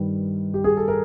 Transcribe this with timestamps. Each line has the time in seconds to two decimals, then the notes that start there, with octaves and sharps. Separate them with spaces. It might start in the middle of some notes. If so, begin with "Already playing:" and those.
Already playing: G2 D#3 G3 B4
0.54 G4
0.64 G#4
0.77 A4
0.88 A#4